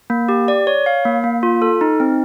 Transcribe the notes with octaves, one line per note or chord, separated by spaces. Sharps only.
A#3
G4
D5
C#5
F5
A#3
A#3
F4
A4
D#4
C4